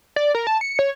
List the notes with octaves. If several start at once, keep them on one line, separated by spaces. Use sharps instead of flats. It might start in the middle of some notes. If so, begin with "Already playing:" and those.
D5
A#4
A5
C#7
C#5